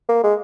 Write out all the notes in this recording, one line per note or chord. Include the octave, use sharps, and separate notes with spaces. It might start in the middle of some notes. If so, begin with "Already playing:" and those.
A#3
G#3